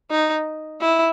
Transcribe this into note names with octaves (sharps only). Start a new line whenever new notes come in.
D#4
E4